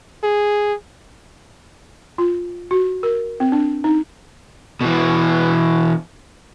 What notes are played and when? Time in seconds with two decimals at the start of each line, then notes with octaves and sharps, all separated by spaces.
0.24 G#4
2.18 F4
2.71 F#4
3.03 A#4
3.40 C4
3.52 D4
3.84 D#4
4.81 B2 E3